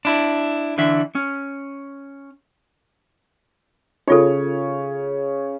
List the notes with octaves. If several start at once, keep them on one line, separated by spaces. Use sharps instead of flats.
D4 E4
D3 E3 D4 E5
C#4
C#3 D#4 F4 A4 C#5